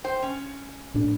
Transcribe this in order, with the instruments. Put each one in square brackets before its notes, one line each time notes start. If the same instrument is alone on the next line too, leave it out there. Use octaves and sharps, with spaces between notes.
[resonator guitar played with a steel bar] C5 G5
C#4
[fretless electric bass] A#1 A2 D4